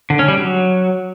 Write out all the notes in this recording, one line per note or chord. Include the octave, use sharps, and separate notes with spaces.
D3
C#4
G3
F#3